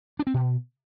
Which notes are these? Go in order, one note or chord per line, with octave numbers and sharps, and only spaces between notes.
D4
C4
B2